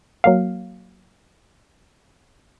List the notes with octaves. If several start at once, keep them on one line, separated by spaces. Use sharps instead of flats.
F#3 A#3 F5